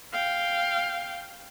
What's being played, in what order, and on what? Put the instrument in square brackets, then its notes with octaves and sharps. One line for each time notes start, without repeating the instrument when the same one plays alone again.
[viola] F5 G5